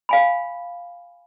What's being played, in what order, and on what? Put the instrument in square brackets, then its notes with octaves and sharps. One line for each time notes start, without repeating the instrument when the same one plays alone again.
[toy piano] F5 G#5 B5